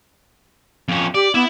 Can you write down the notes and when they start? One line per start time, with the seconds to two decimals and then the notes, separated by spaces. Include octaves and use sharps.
0.89 F2 C#4
1.14 G4 D5
1.34 B3 E4 E5